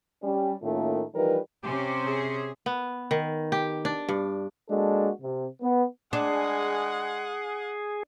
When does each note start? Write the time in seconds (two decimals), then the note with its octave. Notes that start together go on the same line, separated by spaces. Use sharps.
0.22 G3 C#4
0.62 A2 D#3 A3 A#3 C#4 F4
1.14 E3 F3 G3 D#4 A#4 B4
1.63 C3 C#4 G4 C5
2.06 G#4
2.66 B3
3.11 D#3
3.52 G4
3.85 D4
4.09 G2
4.70 G#3 A#3 D4 F#4 A4
5.22 C3
5.62 B3
6.13 G#3 D4 G#4 F#5